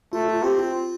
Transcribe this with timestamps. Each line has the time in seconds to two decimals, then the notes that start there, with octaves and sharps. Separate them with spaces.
0.13 A3 F4
0.28 F4
0.43 C4 G4
0.58 F4